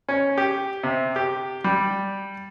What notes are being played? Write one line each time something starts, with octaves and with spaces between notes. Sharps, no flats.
C#4
G4
C3
G4
G3